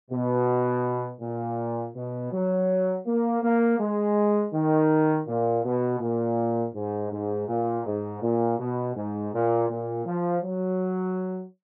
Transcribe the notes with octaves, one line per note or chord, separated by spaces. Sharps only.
B2
A#2
B2
F#3
A#3
A#3
G#3
D#3
A#2
B2
A#2
G#2
G#2
A#2
G#2
A#2
B2
G#2
A#2
A#2
F3
F#3